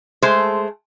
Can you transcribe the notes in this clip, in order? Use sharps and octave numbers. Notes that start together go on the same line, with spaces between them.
G#3 A3 C5